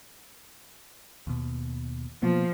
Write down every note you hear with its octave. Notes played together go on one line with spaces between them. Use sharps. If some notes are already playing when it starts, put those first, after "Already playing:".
D#2 B2
B2 F3 A#3 B3